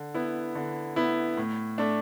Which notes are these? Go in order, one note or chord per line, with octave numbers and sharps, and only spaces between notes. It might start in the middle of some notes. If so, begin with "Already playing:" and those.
Already playing: D3
B3 E4
D3
B3 E4
A2
A3 D4